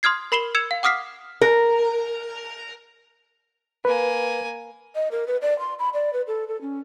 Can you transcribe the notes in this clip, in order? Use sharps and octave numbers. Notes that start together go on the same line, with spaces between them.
C6 D#6 F6 G#6 C7
A#4 B5 C7 E7 F#7 G7
E6 G#6 C#7 E7 F7
F5
F#5 D6 D#6 F6 B6 C7
A#4
A#3 B4 G#5
D#5
A#4
B4
D5
C6
B5
D5
B4
A4
A4
C#4